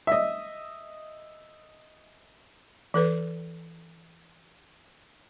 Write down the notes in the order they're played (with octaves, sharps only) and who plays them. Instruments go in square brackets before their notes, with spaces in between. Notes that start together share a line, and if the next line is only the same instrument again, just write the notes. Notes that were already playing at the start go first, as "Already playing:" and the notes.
[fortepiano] D#5 E5
[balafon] E3 A4 B4